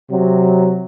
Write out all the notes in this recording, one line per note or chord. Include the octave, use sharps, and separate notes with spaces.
C3 F#3